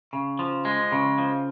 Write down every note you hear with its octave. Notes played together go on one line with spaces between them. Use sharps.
C#3
F3
G#3
C#3
F3